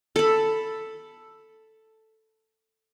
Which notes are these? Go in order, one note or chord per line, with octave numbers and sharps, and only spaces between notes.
A4 B5